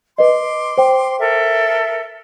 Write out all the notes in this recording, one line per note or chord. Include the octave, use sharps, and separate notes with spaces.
B4 D#5 C6 D6
C5 G5
A4 A#4 E5